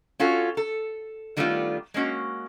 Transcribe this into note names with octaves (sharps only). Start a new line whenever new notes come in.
C#4 F4 F#4 A4
A4
D#3 G3 A3 B3 D4 F4
G#3 A#3 C#4 F#4